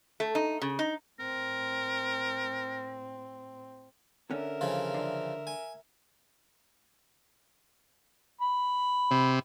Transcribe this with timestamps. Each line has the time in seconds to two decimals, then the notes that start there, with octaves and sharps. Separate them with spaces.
0.20 A3
0.35 D#4
0.62 C#3
0.79 D#4
1.19 A2 C4 A#4
4.31 D3 C#4 A#4 E5
4.61 C#3 E3 F3
4.94 D3
5.47 G#5
8.41 B5
9.11 C3